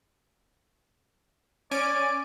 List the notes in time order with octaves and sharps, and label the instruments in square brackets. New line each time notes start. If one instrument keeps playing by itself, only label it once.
[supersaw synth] C#4 G#5 D7 [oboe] D5